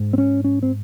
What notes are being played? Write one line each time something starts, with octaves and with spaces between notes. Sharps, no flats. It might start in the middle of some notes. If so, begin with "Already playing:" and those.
Already playing: G#2
C4
C#4
C#4
C4